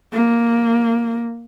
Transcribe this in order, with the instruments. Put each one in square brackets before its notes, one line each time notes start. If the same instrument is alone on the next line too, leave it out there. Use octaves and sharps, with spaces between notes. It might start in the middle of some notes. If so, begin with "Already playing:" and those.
[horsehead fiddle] A#3